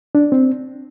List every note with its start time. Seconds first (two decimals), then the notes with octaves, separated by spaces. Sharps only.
0.15 D4
0.32 C4